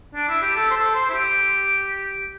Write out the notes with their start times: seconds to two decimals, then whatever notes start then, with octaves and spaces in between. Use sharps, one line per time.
0.15 D4
0.29 E4
0.42 G4
0.56 A4
0.71 C5
0.76 A4
0.94 C5
1.09 E4
1.14 G4